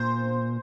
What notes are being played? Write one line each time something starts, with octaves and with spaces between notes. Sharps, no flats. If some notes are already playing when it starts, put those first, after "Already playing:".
Already playing: A#2 C5